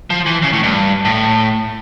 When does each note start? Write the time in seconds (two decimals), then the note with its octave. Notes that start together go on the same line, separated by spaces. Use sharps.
0.10 F3
0.26 E3
0.42 C#3
0.53 A2
0.63 G2
1.05 A2